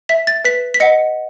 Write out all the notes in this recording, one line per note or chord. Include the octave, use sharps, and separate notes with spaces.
E5 B6
A6
B4 B6
B6
D#5 F#5 C#7